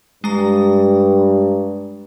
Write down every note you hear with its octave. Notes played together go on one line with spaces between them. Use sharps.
G2 G#3 A#5